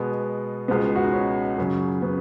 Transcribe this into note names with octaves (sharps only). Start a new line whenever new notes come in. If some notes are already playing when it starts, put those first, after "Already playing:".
Already playing: B2 G#3 B3
C#2 B2 G#3 B3
F#4
D#4
C#4
F#2 C#3 F#3
B3